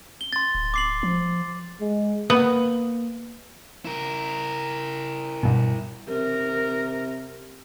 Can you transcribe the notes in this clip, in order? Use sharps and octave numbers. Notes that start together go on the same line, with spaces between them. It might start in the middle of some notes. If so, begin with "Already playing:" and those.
G7
C6 A6
D1
D6 C7 F#7
F3
G#3
A#3 B3
E4 A#4
G2 B2
C3 A#4